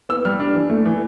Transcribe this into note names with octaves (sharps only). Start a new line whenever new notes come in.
B3 E6
G3 F6
D4
E3
A3
E3